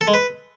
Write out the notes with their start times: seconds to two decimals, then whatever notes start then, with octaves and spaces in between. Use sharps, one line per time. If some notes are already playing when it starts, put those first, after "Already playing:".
0.01 A4
0.07 G#3
0.14 B4